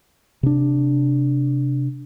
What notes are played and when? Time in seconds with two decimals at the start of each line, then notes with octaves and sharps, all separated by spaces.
0.43 C3 D4